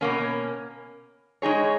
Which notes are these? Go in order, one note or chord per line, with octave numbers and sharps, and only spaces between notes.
B2 A#3 C#4
G#3 D#4 G#4 C#5